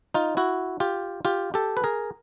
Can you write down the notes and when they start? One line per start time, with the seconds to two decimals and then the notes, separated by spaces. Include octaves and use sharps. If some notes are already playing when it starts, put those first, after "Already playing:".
0.14 D#4 F4
0.37 E4 F#4
0.80 F4 G4
1.25 F4 G4
1.54 G4 A4
1.77 B4
1.84 G#4 A#4